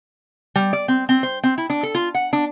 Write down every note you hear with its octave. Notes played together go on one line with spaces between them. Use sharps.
G3
D5
C4
C4
C5
C4
E4
D4
A4
F4
F#5
D4